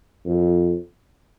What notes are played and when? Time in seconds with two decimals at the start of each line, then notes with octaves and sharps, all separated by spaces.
0.25 F2